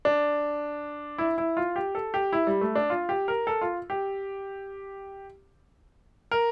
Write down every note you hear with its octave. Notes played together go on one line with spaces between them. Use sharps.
D4
E4
E4
F4
G4
A4
G4
E4
G3
A3
D4
F4
G4
A#4
A4
F4
G4
A#4